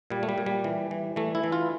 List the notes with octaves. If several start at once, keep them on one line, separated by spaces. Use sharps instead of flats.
A#2 G3
A3
G3
A#2
G3
E3
E3
E3 A3
E4
E3
F4